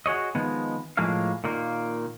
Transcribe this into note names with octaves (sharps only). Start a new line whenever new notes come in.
F#4 G#4 C#5 D#5
D#3 F3 G#3 B3
A2 F3 G#3 A#3 F5
A#2 D#3 A#3